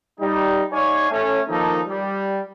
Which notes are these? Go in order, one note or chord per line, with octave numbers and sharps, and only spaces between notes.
G3 D#4
D#4 C#5 D5 F5 G#5
A3 C#4
D#3 F3 A#3 D#4 A4
G3